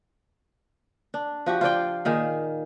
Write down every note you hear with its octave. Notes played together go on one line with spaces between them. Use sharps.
D4
F3 F#4 G4
F4 C5 D5 G5
A#2 D#3 G#4